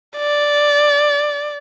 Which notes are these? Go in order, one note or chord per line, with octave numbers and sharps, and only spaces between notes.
D5